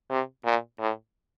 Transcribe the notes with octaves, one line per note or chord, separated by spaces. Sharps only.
C3
A#2
A2